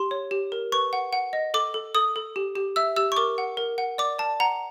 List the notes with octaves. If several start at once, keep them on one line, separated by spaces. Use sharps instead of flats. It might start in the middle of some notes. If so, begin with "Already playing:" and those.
Already playing: G4 C6
C#5
G4
A#4
B4 C#6
F#5
F#5
D#5
A4 D6
A4
A4 D#6
A4
G4
G4
E5 E6
G4 E6
C#6
A#4 D6
F#5
A#4
F#5
D5 D6
D5 A5
F#5 A#5